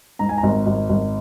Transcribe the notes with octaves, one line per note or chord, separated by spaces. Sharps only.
G#2 A#5
G#5
A#5
G#1
G#1
G#1